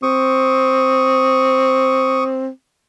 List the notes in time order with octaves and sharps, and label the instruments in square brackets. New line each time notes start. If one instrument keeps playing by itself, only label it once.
[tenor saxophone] C4 [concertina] C#6 D#6